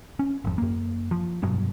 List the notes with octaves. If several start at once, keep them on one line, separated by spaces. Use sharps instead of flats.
C#4
G#1 F2
F#2 A#3
F3
F1 G2 B2 F#3